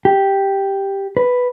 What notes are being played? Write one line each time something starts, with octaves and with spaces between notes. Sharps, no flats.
G4
B4